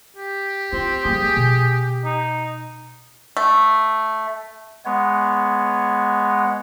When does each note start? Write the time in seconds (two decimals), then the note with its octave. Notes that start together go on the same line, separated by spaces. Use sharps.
0.17 G4
0.73 C4 F4
1.05 G3 A#3 G#4
1.37 B2
2.05 D#4
3.37 A3
4.85 G#3 B3 C#5